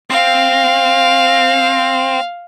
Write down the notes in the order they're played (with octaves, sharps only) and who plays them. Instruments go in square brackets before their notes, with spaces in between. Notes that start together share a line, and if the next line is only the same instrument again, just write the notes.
[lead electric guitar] C4 [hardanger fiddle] F5